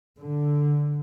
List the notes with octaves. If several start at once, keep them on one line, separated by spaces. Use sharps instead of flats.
D3